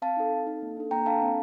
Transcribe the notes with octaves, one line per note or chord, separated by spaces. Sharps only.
C4 F5 A5
D#4 A4
C4
D#4 A4
A#3
D4 A4
A#3 G5 A#5
D4 A4 F5 A5
C4